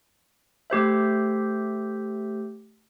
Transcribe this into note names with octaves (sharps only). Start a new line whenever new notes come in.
A3 G4 C5 E5